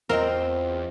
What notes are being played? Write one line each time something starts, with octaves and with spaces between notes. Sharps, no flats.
E2 C4 F4 A#4 D#5 G5